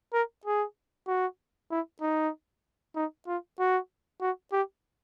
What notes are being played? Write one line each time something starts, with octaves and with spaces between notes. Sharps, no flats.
A#4
G#4
F#4
E4
D#4
D#4
F4
F#4
F#4
G4